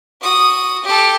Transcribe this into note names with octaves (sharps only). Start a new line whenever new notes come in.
F#4 D#6
G4 A4